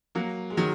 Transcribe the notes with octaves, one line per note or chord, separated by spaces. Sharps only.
F#3 A#3
G#3
D#3 F#3